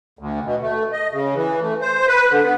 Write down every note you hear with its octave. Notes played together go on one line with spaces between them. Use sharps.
D2
B2
A3
D#5
C#3
E3
A3
C5
B4
D3
B3